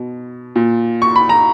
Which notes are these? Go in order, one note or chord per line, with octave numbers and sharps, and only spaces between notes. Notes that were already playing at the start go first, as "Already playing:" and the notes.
Already playing: B2
A#2
C#6
B5
A#5